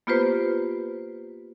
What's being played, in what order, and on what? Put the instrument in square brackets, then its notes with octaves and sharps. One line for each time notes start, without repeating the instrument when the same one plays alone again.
[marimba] A#3 B3 F4 G4 B4 C5